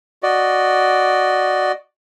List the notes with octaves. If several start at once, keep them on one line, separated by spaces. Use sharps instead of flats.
F#4 D5 D#5